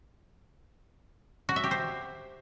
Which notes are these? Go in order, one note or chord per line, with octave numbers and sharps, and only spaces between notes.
F#4
E5
G4
C5